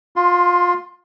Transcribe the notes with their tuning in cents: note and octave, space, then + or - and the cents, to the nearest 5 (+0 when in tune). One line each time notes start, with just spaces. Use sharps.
F4 +20 C6 +0